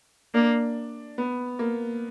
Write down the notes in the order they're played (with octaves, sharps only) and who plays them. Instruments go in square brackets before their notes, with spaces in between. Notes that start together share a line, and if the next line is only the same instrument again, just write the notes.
[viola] A#3 [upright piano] D4
[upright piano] B3
A#3